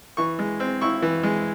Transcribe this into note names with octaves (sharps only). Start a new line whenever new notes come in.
E3 C#6
G#3
C4
E4 C#6
E3
G#3